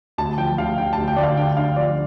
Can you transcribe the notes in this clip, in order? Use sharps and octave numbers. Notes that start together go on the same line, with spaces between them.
D2 A5
F3 G5
D2 F5
D3 G5
A5
D2
G5
D2 D5
F5
D3 G5
D3 F5
F3 D5